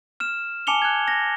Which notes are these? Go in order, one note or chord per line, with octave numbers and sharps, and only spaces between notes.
F6 E7
G#5 A5 D6 C#7 F7 G7
F#6 G#6
A#6